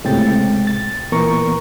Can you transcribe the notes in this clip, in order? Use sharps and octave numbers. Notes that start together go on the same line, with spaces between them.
C#2 A2 C3 G#3 G5 A6
A6
A#2 E3 B3 A#4 A#5 C#6